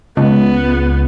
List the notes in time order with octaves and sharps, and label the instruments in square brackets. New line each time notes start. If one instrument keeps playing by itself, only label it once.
[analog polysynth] C#2 [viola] B3